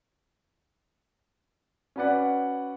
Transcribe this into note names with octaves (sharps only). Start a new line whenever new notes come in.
C#4 F#4 B4 D5 F#5